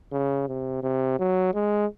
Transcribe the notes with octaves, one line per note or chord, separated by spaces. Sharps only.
C#3
C3
C3
F#3
G#3